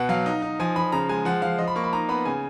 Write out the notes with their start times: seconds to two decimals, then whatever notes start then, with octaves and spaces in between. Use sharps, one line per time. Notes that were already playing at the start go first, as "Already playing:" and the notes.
Already playing: B2 F#5
0.09 F#3 F5
0.26 D#4
0.42 D#4
0.60 F3 G#5
0.76 F3 B5
0.92 C#3 A#5
1.09 G#3 G#5
1.25 F3 F#5
1.42 F3 F5
1.59 F3 D#5
1.68 B5
1.75 A#3 C#6
1.84 B5
1.93 D#4 A#5
2.09 B3 B5
2.26 C#3 G#5